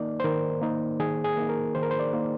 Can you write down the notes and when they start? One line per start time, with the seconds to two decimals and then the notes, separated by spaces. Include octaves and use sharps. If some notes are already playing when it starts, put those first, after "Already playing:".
Already playing: D#3 A#3 D#4 D5
0.20 C5
0.24 D#3 A#4
0.62 A#3 D#4
1.00 D#3 G#4
1.24 G#4
1.37 A#3 D#4
1.49 A#4
1.75 D#3 C5
1.83 A#4
1.91 C5
2.00 D5
2.13 A#3 D#4